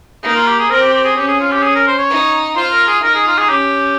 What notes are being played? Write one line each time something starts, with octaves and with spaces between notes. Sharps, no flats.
A#3 D#4
F4
G4
G#4
C4 A#4
G4
G4
G#4
C#4 G4
G#4
F4
G4
G#4
A#4
C5
C#5
D#4
F4 C5
A#4
G#4
D#4 A#4
G#4
F4
G#4
C#4 G4